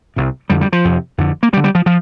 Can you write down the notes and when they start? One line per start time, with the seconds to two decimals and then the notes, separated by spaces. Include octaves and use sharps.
0.16 C2 C3
0.50 F2 D3 G3
0.61 G3
0.73 F3
0.85 F2 C3
1.18 F2 D3
1.43 A#3
1.53 D2 G3
1.57 D3
1.64 G3
1.75 F3
1.86 F3